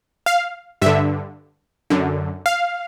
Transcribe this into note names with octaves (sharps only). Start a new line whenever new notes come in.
F5
G2 D3 E5
F#2 D3
F5